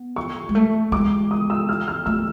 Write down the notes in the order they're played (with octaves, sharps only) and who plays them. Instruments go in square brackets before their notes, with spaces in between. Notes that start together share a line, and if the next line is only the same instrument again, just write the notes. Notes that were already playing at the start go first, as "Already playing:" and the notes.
Already playing: [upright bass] B3
[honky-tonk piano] C#6
[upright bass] G#3
A3
[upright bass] G#3 [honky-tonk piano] D6
[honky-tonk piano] D#6
E6
F6
F6
[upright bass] A3 [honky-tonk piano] E6